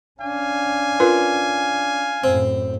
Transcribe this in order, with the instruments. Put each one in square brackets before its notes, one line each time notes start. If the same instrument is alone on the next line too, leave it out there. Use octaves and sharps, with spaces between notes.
[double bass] C#4 D4 [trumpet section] F5 G#5
[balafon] F4 A#4 B4
[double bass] F#2 A2 [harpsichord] C4